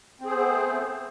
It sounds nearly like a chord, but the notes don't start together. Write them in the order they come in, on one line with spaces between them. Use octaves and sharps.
C4 G#4 C5 B3 A3